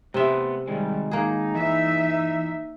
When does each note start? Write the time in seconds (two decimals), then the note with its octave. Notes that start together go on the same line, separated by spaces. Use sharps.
0.14 C3 A3 B3 E5 C6
0.68 D#3 G3 G#3
1.11 A#3 D#4 G#4
1.55 E3 E5